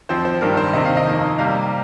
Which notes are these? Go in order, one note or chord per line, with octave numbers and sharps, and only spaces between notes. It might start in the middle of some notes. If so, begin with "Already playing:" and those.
F2 F3 C4 C5
C5
G2 D#3 G3 A#3 A#4
C5
C3 D#3 C4 D#5
F5
D#5
F2 D#3 A#3
C3 G3 A#3 F5